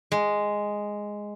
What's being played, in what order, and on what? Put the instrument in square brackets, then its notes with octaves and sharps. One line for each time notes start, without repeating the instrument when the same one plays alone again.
[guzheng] G#3